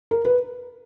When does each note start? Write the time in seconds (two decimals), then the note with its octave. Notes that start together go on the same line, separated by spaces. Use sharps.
0.11 A#4
0.25 B4